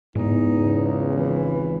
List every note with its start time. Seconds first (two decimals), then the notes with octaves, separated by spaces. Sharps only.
0.15 E2 G#2 B3 D#4
0.52 C#2
1.15 G#1 E3